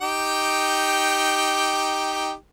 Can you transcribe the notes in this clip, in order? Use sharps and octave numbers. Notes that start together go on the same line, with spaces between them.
D#4 G4 G5